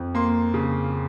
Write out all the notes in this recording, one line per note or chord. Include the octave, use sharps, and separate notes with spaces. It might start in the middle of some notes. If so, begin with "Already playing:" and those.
Already playing: F2
A#3 C6
C#3